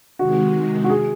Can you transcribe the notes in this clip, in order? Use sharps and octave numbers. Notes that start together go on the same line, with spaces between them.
C3 D#3 G#3 F#4
F#4
G#4